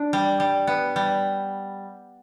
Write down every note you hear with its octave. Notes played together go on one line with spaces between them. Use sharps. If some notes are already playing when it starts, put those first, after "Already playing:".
Already playing: D4
G3
G3
B3
G3